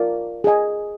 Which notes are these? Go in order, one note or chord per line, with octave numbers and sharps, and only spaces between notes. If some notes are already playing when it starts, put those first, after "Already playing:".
Already playing: F4 A#4 D5 F5
G#4 D#5 G#5